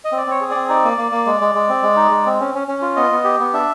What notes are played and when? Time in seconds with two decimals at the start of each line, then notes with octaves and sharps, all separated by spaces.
0.05 D#5
0.12 C4
0.18 D5
0.27 C4 C#5
0.41 G#4
0.51 C4 D5
0.69 D#4 D5
0.84 A#3
0.98 A#3
1.12 A#3
1.26 G#3
1.41 G#3
1.55 G#3
1.69 C4
1.83 G#3
1.97 D#4
2.11 G#3
2.26 C4
2.40 C#4
2.55 C#4
2.68 C#4
2.82 F4
2.96 B3 D#5
3.11 B3
3.24 G4
3.40 B3
3.54 D4 E5